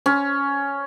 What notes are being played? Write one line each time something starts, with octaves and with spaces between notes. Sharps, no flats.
C#4